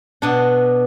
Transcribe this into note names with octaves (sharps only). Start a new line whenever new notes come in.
B2 D4